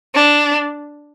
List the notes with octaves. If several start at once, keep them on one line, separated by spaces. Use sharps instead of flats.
D4